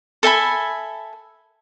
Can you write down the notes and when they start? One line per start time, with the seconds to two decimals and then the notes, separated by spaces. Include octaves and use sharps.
0.23 A4 E5 G#5 B5